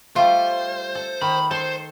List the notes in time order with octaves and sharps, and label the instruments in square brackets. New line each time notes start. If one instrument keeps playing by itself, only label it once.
[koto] G3 A3 [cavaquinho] F4 [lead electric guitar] C5
[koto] A4
[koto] D#3 [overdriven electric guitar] B5
[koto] A4 [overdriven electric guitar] C5